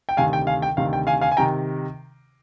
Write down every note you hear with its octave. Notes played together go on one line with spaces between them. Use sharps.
G5
D2 C3 D#3 F5 G#5
G5
F5 G#5
G5
D2 C3 D#3 F5
G5
F5 G#5
F5 G#5
G#5
C3 D#3 G5 A#5